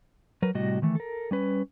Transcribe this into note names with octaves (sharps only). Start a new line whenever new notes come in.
F#3 A#4 B4
A2 C3 G3 F#4 D#5
D#3 E3 A3
A4 A#4
G3 C#4 B4